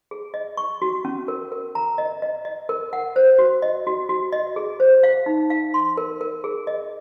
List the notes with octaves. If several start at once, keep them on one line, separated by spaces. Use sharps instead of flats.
G#4
D#5
C#6
F#4
C#4
A#4
A#4
A#5
D#5
D#5
D#5
A#4
F#5
C5
F#4
D#5
F#4
F#4
D#5
G#4
C5
F5
D#4
F5
C6
A#4
A#4
G#4
D#5